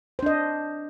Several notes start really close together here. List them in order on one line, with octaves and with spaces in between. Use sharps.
C5 D4 D#5